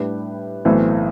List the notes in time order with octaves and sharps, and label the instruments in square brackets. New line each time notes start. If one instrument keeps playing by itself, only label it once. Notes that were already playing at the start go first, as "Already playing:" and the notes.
Already playing: [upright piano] A2 G3 D4 G4 B4
B1 A2 E3 A3 C4